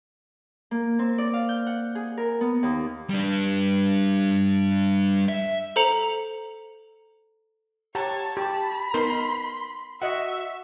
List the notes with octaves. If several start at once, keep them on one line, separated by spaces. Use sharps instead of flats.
A#3
C4
D5
F5
G6
F#5
G#4
A#4
B3
D#2
G3 D4
E5
A4 C5 A#5 C#7 F7 F#7
G4 C#5 F#5 A5 A#5
G4 B5
B3 D#4 A#4 C6
F#4 D#5 E5 F#5